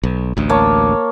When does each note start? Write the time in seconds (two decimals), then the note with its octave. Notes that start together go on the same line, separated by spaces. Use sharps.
0.03 B1
0.37 A1 D2
0.49 A#3 C#5 A5